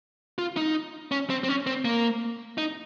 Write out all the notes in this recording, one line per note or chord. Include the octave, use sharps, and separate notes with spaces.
F4
D#4
C#4
C4
C4
C#4
C4
A#3
D#4